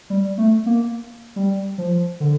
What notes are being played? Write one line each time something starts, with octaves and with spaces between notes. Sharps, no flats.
G3
A3
A#3
G3
F3
D3